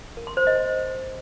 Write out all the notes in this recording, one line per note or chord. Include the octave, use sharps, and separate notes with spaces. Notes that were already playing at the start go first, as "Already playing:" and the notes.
A#4
C6
C5
D#5